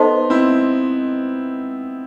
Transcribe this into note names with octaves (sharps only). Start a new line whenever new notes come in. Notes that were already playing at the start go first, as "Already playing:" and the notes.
Already playing: B3 D#4 A4 C5 D#5 A5 C6
C4 E4